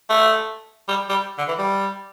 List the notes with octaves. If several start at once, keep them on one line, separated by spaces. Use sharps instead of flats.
A3
G3
G3
D3
E3
G3